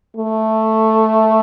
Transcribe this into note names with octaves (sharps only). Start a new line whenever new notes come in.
A3